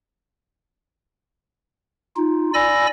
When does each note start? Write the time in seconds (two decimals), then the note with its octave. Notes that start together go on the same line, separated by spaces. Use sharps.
2.16 D#4 F4
2.54 D5 G#5 B5 E6 A#6